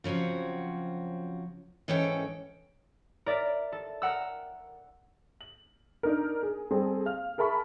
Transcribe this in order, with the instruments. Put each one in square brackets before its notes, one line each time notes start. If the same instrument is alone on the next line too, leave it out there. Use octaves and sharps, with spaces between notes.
[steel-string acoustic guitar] C#3 F3 F#3 C4 F#4
G#2 E3 C#4 A4 G5
[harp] A#4 D5 E5
A4
A#4 F#5 E6
[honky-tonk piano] F#7
D4 D#4 A#4
G#4
G3 C4 G#4 A4
F5 F6
G#4 A#4 E5 A5 B5 C#6